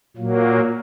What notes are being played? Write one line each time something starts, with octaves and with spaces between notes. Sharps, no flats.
A#2 F#3 A#3